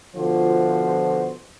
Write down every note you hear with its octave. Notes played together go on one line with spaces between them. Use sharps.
B2 D3 F3 F4 F#4 C5